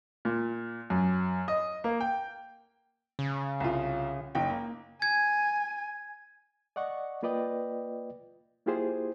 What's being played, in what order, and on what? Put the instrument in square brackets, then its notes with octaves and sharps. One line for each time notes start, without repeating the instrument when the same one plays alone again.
[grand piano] A#2
F#2
D#5
A#3
G5
[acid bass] C#3
[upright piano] C2 F4
F#1 D#4 G5
A#3
[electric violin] G#5 [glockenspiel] G#6
[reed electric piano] D5 D#5 F#5 C#6
A#3 F4 B4 D5 D#5 G5
A#3 E4 F4 G4 G#4 C5